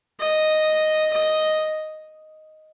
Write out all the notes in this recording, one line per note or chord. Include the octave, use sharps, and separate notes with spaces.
D#5
D#5